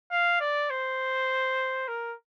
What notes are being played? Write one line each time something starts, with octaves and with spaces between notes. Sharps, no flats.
F5
D5
C5
A#4